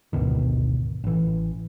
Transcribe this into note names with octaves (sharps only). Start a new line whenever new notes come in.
G#1 D2 B2 D#3
A1 E3